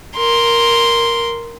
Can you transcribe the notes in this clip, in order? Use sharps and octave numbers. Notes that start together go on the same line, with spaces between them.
A#4 C6